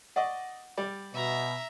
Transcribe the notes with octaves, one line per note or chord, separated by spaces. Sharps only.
D5 D#5 F#5 C#6
G3 D5
B2 E5 A#5